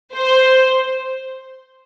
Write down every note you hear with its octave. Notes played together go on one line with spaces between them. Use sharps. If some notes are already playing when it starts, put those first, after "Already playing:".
C5